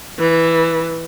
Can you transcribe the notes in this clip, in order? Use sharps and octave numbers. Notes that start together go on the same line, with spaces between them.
E3